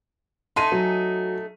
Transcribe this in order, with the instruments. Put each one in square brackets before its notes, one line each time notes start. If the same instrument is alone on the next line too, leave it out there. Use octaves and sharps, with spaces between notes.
[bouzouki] A3 D#4 G#5 [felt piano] C6 D#7
[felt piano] F#3